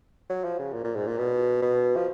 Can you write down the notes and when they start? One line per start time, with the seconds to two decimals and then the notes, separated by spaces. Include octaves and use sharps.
0.29 F#3
0.44 F3
0.59 C#3
0.73 A#2
0.84 A#2
0.95 G#2
1.07 A#2
1.18 B2
1.62 B2
1.96 F3